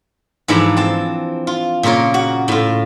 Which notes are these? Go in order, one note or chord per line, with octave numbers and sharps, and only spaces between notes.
G#2 E3 F3 D4 A#5 B5
C4 A5
F4
A#2 C#3 F4 A#4 C#5
F#4
A2 F4